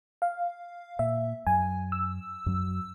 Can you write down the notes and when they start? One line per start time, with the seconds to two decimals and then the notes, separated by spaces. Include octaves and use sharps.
0.22 F5
0.99 A#2 E5
1.47 F#2 G#5
1.92 E6
2.46 F#2 F#3